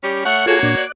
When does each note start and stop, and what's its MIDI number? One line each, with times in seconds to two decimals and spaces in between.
0.03 0.22 55
0.03 0.22 61
0.03 0.22 67
0.25 0.45 57
0.25 0.45 73
0.25 0.45 78
0.46 0.82 58
0.46 0.59 65
0.46 0.82 66
0.46 0.59 68
0.46 0.59 69
0.46 0.82 73
0.63 0.75 46
0.63 0.75 62
0.77 0.92 74
0.77 0.92 90